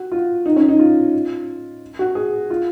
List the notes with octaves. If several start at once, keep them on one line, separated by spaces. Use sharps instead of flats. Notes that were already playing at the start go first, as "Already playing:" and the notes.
Already playing: F#4
F4
D#4
C#4
D#4
F4
F#4
G#4
F4